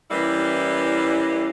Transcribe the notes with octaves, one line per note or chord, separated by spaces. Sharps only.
E3 G3 A#3 C#4 E4